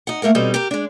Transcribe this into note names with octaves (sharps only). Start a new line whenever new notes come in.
D#4 F#5
A3 A#3 A#4 F#5
B2 G3 C4 C#4 D#4 A4
G4 A#4
G#3 D4